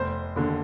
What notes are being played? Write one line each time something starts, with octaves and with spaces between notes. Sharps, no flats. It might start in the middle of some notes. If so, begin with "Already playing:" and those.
Already playing: F1 C5
D#2 D3